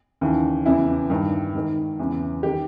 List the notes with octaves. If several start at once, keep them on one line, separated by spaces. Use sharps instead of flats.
D#2 C#3 E3
E2 C#3 E3 E4
G2 D#3
G#2 D#3
E2 C#3 E3
D#3 G4